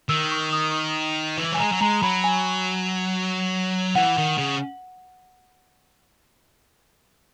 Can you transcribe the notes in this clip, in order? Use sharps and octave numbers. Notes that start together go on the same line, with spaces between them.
D#3 E6
C#6
D#6
E3
F#3 G#5
G#3 A#5
F#3
G#3 A#5
F#3 B5
G#5
E3 F#5
D#3
C#3